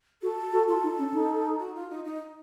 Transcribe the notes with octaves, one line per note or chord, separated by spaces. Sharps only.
F#4 A4
F#4
F4 A4
D#4
C#4
D#4
F#4
F4
D#4
D#4